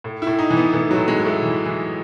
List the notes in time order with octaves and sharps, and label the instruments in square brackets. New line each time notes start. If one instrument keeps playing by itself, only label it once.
[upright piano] A2
E4
A2
D#4
E3
B3
E3 A3
F#3
A2
G#3
A2
A3
E3
E3